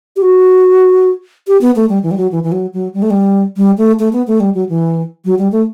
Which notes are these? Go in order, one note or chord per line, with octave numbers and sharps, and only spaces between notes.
G4
F#4
G4
B3
A3
G3
E3
G3
F#3
E3
E3
F#3
F#3
G3
A3
G3
G3
A3
A3
B3
A3
G3
F#3
E3
F#3
G3
A3